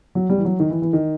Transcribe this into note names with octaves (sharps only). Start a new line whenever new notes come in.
F#3
G3
E3
F#3
D#3
E3
E3
D#3